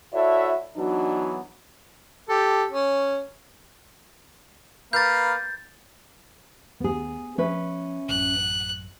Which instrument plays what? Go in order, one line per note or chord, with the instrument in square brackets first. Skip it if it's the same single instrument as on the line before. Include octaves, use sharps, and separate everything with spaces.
[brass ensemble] E4 F#4 A4 C#5 D5 E5
E3 F#3 B3 D4 D#4 F#4
[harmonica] G4 A4
C#4
[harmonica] A#3 B4 F5 [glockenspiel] G6 A6
[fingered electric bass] D#2 [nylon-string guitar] B3 G#4
[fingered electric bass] F3 [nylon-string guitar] C#4 B4 E5
[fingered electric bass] A1 F#2 [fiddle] F#6